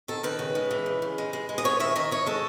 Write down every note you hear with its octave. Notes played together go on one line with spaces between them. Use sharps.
D#3 A4
D#3 B4
C#3
G#3
E3
C#3
C#3
G#3
G#3
G#3
D#5
A3 C#5
D#3 E5
D#3 D#5
D#3 C#5
G#3 A4